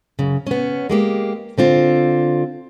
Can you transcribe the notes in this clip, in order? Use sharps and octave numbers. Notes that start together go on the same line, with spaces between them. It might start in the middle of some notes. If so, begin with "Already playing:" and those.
F#2 C#3
B3 C#4
G#3 A#3 G4
D3 C4 F4